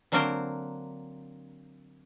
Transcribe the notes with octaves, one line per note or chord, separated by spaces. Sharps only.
D3 F#3 A#3 C4 A#4 C5